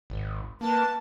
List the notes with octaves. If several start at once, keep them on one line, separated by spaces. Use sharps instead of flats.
G#1
A#3 B4 A5